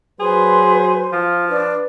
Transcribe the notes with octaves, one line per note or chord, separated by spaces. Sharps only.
F#3 G#4 B4 C5 C6
F3 F4
D4 B4